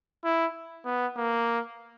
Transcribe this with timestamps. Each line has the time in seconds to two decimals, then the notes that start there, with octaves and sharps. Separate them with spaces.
0.24 E4
0.85 B3
1.17 A#3